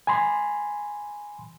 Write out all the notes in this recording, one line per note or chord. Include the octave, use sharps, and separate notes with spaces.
G#5 B5 C6